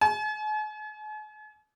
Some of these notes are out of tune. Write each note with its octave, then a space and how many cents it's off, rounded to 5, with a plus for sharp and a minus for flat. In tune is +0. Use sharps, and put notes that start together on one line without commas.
G#5 +45